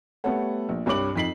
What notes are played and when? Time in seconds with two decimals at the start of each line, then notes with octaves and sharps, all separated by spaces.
0.24 G3 A3 B3 A4 C#5 F#5
0.69 A#1
0.86 C2 G2 C#5 D6 F#7
1.16 F2 D#4 B6 C7 F#7